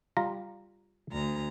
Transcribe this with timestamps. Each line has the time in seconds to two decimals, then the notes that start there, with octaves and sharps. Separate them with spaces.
0.17 G3 F4 A#5
1.11 D2 A#5